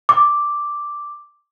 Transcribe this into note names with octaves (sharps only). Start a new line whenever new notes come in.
D6